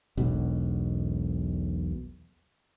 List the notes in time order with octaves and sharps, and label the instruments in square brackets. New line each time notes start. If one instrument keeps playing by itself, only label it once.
[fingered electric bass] E1 B1 B2